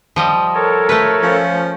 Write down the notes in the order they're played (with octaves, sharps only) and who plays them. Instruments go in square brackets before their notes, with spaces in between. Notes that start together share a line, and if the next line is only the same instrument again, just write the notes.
[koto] F3 G3 D#5
[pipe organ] A4 A#4 C#5
[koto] A3 B4
[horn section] F3 C#4